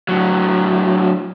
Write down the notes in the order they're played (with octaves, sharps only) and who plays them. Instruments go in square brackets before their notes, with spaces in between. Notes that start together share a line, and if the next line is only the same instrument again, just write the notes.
[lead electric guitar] A2 F#3